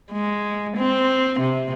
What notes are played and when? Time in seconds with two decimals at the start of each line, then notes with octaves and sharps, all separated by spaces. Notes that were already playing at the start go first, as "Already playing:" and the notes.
0.12 G#3
0.77 C4
1.40 C3